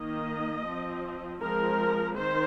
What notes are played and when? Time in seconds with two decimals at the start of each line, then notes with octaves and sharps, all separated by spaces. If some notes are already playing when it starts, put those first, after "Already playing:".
Already playing: D#3 A#3 D#5
0.65 F3 C4
1.41 F3 G#3 C4 A#4
2.15 D#3 C5